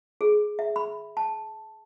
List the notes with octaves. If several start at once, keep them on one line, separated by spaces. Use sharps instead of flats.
G#4
E5
B5
A5